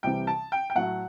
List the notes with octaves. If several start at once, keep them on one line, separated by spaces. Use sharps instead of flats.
C2 C3 E3 G3 G5
A5
G5
G5
A2 F#3 A3 F#5